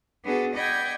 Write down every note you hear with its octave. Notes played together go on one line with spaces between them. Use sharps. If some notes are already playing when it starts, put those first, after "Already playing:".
B3 D4 F#4 G#4 A4
D5 D#5 F#5 G5 B5 G#6